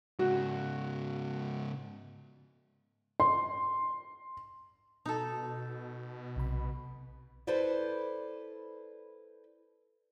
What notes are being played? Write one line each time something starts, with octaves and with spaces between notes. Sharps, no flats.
G#2 C#3 F#4
C6
B2 D#4 A4
B1 C3 B5
E4 A4 B4 C5 D5